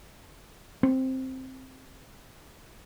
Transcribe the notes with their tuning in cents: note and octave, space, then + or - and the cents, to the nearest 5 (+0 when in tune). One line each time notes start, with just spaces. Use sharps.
C4 +5